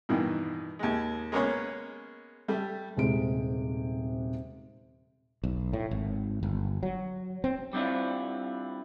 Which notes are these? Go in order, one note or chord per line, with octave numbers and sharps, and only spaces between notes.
G2 B2 D#3 E3
D#2 G#3
G#3 A#3 B3 C#4 G#4 C#5
G3 A3
D#1 C3 G#3 D7
B1
A2
G#1
G1
F#3
C4
G3 C4 D4 E4 F4